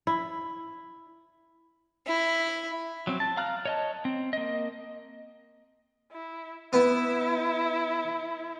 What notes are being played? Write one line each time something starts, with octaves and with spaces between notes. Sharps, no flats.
E4
E4
F#3 C4
A5
F5 A#5 F6 F#6
C#5 D#5 A5
C4
A#3 D#5
E4
B3 E4